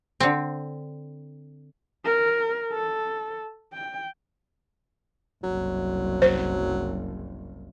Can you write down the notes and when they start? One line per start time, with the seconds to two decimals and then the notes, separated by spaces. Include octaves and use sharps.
0.20 D3 C4
2.05 A#4
2.73 A4
3.73 G5
5.43 F#1 C2 F#3
6.22 C5